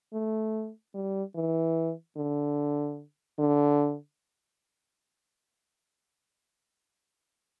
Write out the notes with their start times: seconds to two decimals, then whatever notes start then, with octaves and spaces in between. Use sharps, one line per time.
0.13 A3
0.95 G3
1.35 E3
2.17 D3
3.39 D3